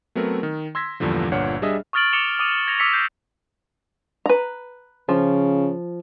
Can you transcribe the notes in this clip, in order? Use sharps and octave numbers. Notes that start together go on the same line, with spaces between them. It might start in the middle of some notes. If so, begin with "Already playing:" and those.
F#3 A3 B3 C4 A#4
D#3
C6 E6 G#6 A#6 B6
E2 G2 A#2 D3 F3
G1 A#2 D4 C#5 F#5 F6
G3 D4 G#4 D#5 E5
C#6 D#6 F6 A6 D7 F#7
D6 C#7 E7 F7 G7
D6 D#6 D#7 F7
G#6 A#6 C#7 F7
D6 E6 B6 C#7 F7
G6 A#6 C7
B4 A#5
C#3 F3